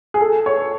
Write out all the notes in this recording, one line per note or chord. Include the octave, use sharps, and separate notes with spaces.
G#4
A4
C#5